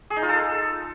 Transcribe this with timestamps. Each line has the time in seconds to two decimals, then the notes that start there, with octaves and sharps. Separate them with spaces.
0.10 G#4
0.16 D#4
0.23 F4
0.29 A4